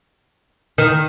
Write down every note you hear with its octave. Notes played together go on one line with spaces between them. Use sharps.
D#3